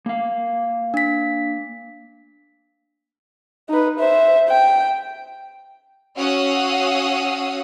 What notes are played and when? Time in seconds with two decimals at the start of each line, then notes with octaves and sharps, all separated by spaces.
0.06 A#3 F5
0.94 D4 B6
3.69 D#4 B4
3.99 C5 E5
4.49 G5
6.17 C#4 F#4 F5 F#5 D#6 E6